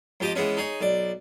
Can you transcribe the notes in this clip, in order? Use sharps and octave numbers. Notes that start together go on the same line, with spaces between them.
F2 F3 G4 D#5 D6
E3 G#3 B3 C#4
D#4 G#4 C#5
B1 D5